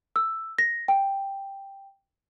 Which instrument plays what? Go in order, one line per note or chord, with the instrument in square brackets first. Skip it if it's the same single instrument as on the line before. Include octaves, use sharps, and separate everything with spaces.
[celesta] E6
A#6
G5